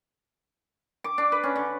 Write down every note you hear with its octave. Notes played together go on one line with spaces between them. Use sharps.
D6
D4
B4
C#4
D3